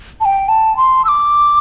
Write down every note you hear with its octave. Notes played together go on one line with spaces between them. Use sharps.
A5
G5
A5
C6
E6
D6